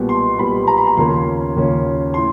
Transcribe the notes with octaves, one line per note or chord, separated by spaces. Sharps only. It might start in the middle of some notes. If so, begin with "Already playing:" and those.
Already playing: B1 A#2 G3 B3
C6
B1 A#2 G3 B3 B5
A#5
B5
A#5
D#2 C#3 F3 A#3 C#4 C6
D#2 C#3 F3 A#3 C#4
A2 C6